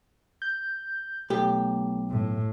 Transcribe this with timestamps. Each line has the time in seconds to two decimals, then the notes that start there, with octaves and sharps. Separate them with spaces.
0.42 G6
1.30 B1 A3 G4
2.10 A2